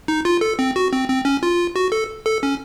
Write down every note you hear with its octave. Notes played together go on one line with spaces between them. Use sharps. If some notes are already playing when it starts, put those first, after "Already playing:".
D#4
F4
A4
C4
F#4
C4
C4
C#4
F4
F#4
A4
A4
C#4